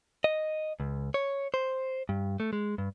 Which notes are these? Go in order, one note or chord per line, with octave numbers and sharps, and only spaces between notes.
D#5
C#2
C#5
C5
G2
A3
G#3
G2